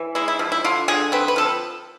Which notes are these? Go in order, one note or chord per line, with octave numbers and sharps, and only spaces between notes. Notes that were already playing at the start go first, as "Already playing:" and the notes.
Already playing: E3
G#3 E4
E4
F3
E4
D3 F4
D3 G#4
C4 B4
B4
F3 A4